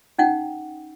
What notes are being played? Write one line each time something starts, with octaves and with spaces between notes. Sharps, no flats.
C#4 D#4 F#5 G5